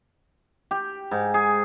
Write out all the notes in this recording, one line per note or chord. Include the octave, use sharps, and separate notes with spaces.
G4
G#2
G#4